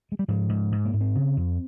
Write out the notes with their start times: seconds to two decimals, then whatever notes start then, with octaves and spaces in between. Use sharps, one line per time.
0.12 G#3
0.19 G3
0.28 G#2 F3
0.49 G#2
0.72 G#2
0.85 A#3
0.93 G#2
1.01 C4
1.15 C#3
1.37 F2